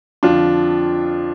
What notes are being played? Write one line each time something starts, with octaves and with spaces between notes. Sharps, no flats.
F2 D3 F3 D4 F4